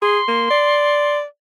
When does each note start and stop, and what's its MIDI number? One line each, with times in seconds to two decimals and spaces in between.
0.02 0.19 68
0.02 1.18 84
0.28 0.49 58
0.50 1.24 74